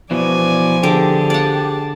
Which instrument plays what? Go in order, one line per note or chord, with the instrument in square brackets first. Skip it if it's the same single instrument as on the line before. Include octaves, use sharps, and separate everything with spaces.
[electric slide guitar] B2 E3 [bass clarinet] F3 [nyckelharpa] D5 G#5
[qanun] D3 D6 [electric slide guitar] G4 [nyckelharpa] G#4 A5
[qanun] D5 F#5